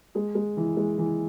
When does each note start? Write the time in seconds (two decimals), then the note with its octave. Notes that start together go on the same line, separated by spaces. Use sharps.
0.15 G#3 G#4
0.35 G#3
0.57 E3
0.77 G#3
0.98 E3